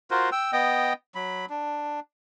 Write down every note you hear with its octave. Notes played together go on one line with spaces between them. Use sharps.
F4 F#4 A#4 C5
G5 E6
B3 D#5 G5
F#3 B5
D4